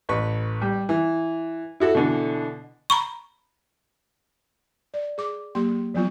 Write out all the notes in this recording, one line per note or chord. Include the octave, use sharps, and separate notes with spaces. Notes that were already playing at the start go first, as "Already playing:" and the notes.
A1 B4 C#6
G3
E3
E4 F#4 A4
B2 D3 E3
A#5 B5 C#6
D5
G#4 D6
F#3 A#3 G4 C6
F3 F#3 B3 F4